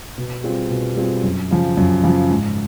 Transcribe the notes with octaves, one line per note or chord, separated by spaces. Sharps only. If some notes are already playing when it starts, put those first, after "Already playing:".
B2
G3 C4 F4 G#4
B2
G3 C4 F4 G#4
F#2
C#3 F3
F#2
C#3 F3
G#2